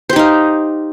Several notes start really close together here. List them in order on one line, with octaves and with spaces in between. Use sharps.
C5 G4 D#4 F5